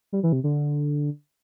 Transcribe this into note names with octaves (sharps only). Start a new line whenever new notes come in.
G3
E3
C3
D3